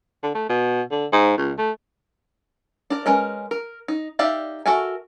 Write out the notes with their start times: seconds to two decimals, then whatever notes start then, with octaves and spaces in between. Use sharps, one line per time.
0.23 D3
0.35 A3
0.49 B2
0.91 D3
1.12 G#2
1.38 C#2
1.58 A3
2.90 D4 A#4
3.06 G#3 C#4 A#4 B4 D#5
3.51 A#4
3.88 D#4
4.19 D#4 G4 D5 E5 F5
4.66 F#4 A4 A#4 E5 G#5